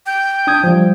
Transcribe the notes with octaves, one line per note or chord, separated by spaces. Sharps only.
G5
D4 D#6 G#6
F3 G3